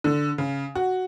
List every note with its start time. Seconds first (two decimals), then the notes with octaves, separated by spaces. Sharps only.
0.04 D3
0.38 C#3
0.75 F#4